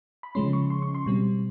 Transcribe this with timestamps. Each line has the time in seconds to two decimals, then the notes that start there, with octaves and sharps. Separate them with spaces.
0.23 B5
0.35 C#3 F3 G#3 C#4 C6
0.53 C#6
0.70 C6
0.82 C#6
0.95 C6
1.06 B2 G3 C4